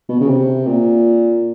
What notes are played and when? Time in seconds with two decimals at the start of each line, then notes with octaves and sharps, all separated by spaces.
0.09 B2
0.21 C#3
0.28 C3
0.67 A#2